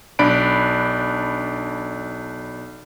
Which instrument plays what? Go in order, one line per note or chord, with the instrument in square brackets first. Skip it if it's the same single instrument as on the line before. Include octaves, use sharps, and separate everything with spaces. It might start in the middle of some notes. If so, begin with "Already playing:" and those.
[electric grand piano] B1 D4 D5 B5 F#6 D7